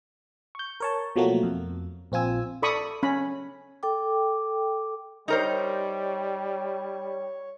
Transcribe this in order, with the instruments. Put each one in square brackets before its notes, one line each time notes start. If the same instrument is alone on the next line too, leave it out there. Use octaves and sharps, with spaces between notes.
[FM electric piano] C#6 G6
A#4 C#5 A5
B2 F3 F#3 A3 A#3 F#4
F2
A#1 C4 F4 G#5 E6
[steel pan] A4 D5 B5 C#6 D#6
C#4 B5
[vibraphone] A4 G5 D6
[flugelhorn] G3 [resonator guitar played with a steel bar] D#4 A#4 C5 [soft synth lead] C#5